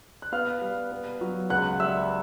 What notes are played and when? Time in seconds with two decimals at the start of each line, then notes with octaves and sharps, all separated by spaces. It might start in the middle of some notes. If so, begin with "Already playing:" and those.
0.22 F#6
0.32 B3 F5 F6
0.61 G3
0.91 B3
1.21 F#3
1.50 C#2 F#5 F#6
1.80 G3 E5 E6